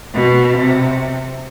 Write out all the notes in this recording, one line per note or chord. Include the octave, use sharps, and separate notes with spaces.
B2
C3